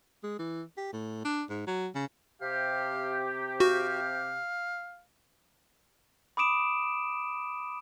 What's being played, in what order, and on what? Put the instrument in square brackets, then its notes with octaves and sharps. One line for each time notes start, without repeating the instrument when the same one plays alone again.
[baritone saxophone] G#3
E3
G4
A2
D4
G#2
F#3
C#3
[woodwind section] C3 G4 [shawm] F5
[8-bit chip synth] F#4 [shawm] F5
[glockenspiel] B5 D6 D#6 D7 E7